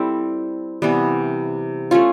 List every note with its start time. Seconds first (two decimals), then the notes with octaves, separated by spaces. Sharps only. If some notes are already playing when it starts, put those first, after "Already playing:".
Already playing: G3 C4 E4 A4
0.82 C3 E3 G3 B3
1.91 A3 C#4 F4